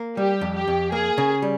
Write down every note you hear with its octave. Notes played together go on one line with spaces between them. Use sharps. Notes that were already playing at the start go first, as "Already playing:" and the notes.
Already playing: A#3
G3 G4
F2
G4
F2
A#3 G#4
C#3
G3